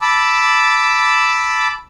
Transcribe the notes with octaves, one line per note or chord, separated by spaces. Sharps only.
A5 B5 D6 E6